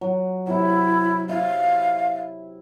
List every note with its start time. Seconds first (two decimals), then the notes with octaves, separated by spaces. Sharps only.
0.01 F#3
0.47 C3 F#3 E4
1.29 E4 F5